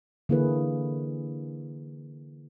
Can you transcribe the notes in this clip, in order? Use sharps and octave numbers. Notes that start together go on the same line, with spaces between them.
D3 E3 A#3 E4 G#4 B4